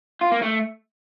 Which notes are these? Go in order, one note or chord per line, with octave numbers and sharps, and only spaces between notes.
F4
A#3
A3